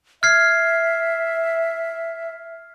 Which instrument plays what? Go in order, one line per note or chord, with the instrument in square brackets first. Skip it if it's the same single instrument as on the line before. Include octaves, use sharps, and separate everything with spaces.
[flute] E5 [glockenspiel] F6 G#6 C7